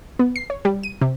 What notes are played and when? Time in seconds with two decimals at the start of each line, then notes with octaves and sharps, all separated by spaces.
0.19 B3
0.36 C7
0.50 C#5
0.65 G3
0.83 D#7
1.01 C3